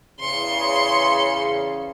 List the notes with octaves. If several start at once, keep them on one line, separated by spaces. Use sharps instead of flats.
E2 C#3 C6 C#7